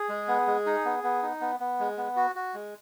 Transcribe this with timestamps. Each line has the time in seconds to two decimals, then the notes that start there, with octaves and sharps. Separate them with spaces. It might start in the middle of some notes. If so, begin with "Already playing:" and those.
Already playing: G#4
0.09 G#3
0.28 B3
0.47 G#3
0.66 D#4
0.85 B3
1.03 B3
1.22 D#4
1.41 B3
1.60 B3
1.79 G#3
1.97 B3
2.16 F#4
2.35 F#4
2.54 G#3